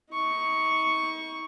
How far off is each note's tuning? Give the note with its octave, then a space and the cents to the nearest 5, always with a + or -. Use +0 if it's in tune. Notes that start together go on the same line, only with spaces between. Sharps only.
D#4 +40 C#6 +0